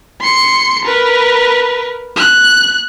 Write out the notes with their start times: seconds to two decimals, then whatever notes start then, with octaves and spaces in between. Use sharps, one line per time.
0.21 C6 C#7
0.85 A#4 B4
2.17 F#6